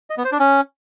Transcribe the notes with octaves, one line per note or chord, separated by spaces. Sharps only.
D#5
B3
C5
D4
C#4